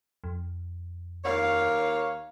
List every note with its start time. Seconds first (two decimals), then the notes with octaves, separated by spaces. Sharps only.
0.24 F2
1.25 D#2 A#3 C#5 F5